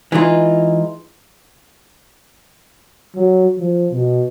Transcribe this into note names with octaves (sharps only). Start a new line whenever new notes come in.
E3 G#3 D#4 F4
F#3
F3
B2